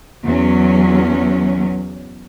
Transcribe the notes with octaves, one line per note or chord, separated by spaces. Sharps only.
E2 F#3 C#4